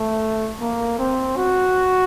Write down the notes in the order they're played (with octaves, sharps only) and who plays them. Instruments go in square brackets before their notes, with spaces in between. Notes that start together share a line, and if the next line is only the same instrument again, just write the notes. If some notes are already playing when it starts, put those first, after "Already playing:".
Already playing: [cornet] A3
A#3
C4
F#4